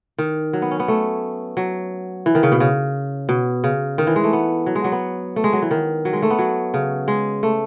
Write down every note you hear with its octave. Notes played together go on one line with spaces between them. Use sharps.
D#3
F#3
B3
C#4
B3
A3
F#3
E3
D#3
C#3
B2
C#3
B2
C#3
D#3
E3
G#3
A3
B3
F#3
G#3
F#3
B3
A3
G#3
F#3
E3
D#3
F#3
G#3
A3
B3
F#3
C#3
G#3
A3